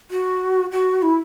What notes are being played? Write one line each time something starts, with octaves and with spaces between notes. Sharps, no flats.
F#4
F#4
E4